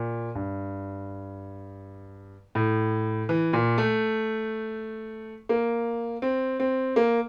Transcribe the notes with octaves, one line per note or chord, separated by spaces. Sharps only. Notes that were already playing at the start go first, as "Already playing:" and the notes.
Already playing: A#2
G2
A2
E3
A#2
A3
A#3
C4
C4
A#3